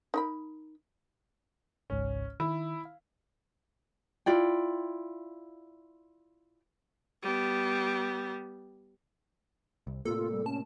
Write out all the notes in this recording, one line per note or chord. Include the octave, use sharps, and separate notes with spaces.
D#4 A#4 B5
G#1 C#2 G#2 C#4
D#3 E4
F5
E4 F4 D5 G5
G3 B3
C2
A2 C3 A#3 F4 A4
F4
G3
C#4 A5